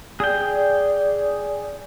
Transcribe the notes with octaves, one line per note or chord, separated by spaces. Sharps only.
G#4 D5 G5